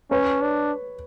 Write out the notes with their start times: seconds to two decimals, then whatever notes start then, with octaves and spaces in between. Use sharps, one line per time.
0.11 C#4 B4 C#5
0.41 D4